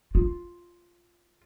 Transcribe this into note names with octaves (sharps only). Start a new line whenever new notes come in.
F4